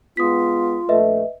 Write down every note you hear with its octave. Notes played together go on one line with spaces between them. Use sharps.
G#3 B3 F4 D#6 B6
A#1 A3 B4 D#5 E5